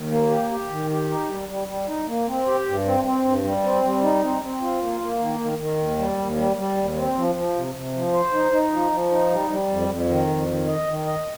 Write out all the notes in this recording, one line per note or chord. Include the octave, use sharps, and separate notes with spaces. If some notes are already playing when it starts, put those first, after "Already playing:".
Already playing: D#2
A#3
G4
G4
D#3
G4
D#4
G3
G3
G3
D#4
A#3
C4
G4
G2
C4
C4
G2
G3
C4
G3
D#4
C4
C4
F4
A#3
A#3
D#3
D#3
D#3
D#2
G3
D#2
G3
G3
D#2
C4
F3
F3
C3
C3
F3
C5
D#4
D#4
F3
F3
D#4
G3
G3
F2
F2
D#3
F2
D#3
D#5
D#3
D#5